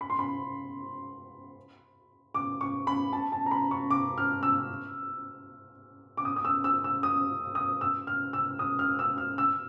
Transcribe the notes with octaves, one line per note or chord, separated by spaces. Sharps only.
B5
C6
B5
D6
C#6
B5
A5
A5
A#5
B5
C#6
D6
F6
E6
D6
D#6
D#6
E6
E6
E6
D#6
D#6
E6
F6
E6
D#6
F6
E6
F6
E6